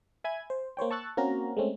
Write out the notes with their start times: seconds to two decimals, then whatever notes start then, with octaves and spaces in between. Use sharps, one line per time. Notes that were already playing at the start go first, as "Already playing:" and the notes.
0.24 E5 G#5 B5 G#6
0.50 C5
0.77 A#3 C5 C#5 G5
0.91 A5 C#6 E6 F#6 A6
1.17 A#3 C4 C#4 F#4 A#4 A#5
1.57 G#3 A3 C4 C#4